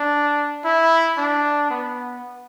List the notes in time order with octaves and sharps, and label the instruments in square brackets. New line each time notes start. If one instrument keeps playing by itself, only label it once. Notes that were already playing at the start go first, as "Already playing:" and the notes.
Already playing: [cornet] D4
E4
D4
B3